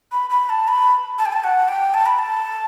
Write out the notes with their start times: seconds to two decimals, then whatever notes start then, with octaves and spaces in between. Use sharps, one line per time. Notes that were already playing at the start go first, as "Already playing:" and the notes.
0.12 B5
0.30 B5
0.49 A5
0.68 B5
1.18 A5
1.26 G5
1.33 A5
1.44 F#5
1.68 G5
1.94 A5
2.06 B5
2.18 A5